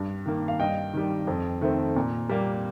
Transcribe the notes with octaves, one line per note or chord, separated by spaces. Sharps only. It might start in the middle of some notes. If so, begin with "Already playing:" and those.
Already playing: G2
D#3 A#3
F5
G2 D#5 G5
D#3 G3
F2
D#3 A3 C4
A#2
G3 A#3